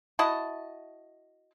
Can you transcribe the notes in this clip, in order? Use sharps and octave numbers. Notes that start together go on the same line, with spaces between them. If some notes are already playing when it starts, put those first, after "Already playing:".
E4 F#4 D#5 A5